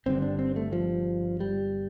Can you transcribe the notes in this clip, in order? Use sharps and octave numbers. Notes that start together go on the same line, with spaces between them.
G1 G2 D3 C4
D4
C4
A3
F3
G3